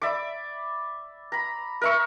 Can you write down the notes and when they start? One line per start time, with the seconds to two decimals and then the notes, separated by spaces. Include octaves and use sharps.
0.02 D5 E5 B5 D6
1.32 A#5 B5
1.81 A#4 E5 C#6